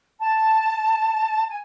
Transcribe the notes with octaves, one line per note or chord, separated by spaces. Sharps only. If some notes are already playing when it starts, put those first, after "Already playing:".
A5
G#5